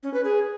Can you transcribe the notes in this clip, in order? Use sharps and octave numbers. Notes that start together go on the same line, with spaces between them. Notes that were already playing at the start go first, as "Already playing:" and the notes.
C#4
B4
G#4